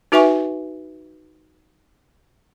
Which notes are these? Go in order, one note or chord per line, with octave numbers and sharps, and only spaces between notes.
D#4 F#4 B4 E5 G#5 C#6